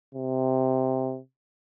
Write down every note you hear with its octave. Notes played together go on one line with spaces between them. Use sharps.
C3